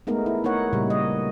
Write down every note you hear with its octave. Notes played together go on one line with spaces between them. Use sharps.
G#3 A3 B3 D#4 A#4
E4
A#3 D#4 A#4 C#5 F#5
A#2 C#3 G3
D#5